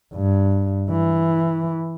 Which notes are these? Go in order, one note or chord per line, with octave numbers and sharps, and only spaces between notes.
G2
E3